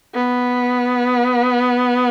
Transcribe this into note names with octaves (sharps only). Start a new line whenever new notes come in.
B3